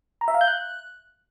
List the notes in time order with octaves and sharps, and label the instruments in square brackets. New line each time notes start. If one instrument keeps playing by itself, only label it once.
[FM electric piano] A#5
E5
F5
G6
F#6